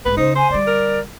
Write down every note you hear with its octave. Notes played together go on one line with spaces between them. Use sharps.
B1 G#2 B4
C#3 D#4 C5
C5 G#5
D3 G3 D5
A#4